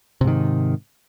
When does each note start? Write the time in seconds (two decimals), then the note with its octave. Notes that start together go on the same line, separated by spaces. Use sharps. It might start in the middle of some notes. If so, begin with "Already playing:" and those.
0.21 C3
0.24 G#2
0.27 D#3